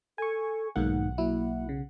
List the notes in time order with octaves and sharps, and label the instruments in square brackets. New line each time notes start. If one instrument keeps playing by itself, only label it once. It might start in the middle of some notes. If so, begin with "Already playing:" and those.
[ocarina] A4 [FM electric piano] G#5 C#6
[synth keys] B1 F#5 [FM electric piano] G#2 D#3 A#3 [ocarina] D#4
[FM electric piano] F#3 E4 [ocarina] A#3
[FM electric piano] C#3